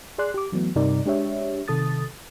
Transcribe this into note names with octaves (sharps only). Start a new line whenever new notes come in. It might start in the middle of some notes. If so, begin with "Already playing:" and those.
G#4 D5 C6 F#6
G4 D6
E3 F#3 A3 B3
G2 C3 G3 D#4 A#4 D5
G#3 D4 G4 C#5 E5
C3 D#3 A4 D#6 A6